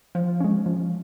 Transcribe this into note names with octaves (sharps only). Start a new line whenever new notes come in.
F3
G#3 C#4
F3